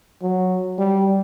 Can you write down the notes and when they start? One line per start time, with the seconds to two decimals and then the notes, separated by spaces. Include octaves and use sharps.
0.22 F#3
0.78 G3